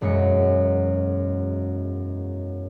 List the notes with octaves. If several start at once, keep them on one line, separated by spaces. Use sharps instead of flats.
E1 F#2 G#3 C#7